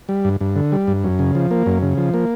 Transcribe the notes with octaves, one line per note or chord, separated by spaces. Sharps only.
G3
G2
G2
D3
G3
G2
F#2
C#3
F3
A#3
F#2
C#3
F3
A#3